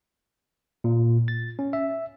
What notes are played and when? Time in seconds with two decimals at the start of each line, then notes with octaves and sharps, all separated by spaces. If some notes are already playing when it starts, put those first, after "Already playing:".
0.84 A#2
1.28 A6
1.59 C#4
1.73 E5